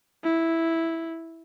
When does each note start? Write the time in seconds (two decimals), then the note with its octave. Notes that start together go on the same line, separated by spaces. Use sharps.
0.24 E4